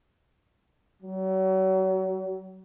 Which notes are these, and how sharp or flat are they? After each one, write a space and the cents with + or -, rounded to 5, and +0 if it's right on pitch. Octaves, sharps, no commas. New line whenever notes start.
F#3 +35